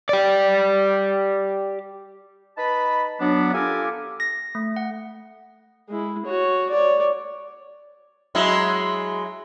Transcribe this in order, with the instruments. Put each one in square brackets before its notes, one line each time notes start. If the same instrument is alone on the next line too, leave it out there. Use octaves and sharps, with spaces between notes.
[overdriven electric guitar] G4 D5
[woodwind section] D#4 B4 A5 B5
F#3 B3 D4
F4 G4 A4 A#4 G#5 D6
[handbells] A#6
A3
F#5
[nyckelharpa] G#3 E4
F#4 C#5
C#5 D5
[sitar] F#3 G#3 E4